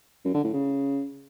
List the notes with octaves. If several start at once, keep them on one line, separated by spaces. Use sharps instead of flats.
F#2
D3
A2
C#3